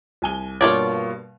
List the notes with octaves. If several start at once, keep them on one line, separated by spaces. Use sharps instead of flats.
C2 G#5 G7
G2 B2 A#3 F4 C#5 D5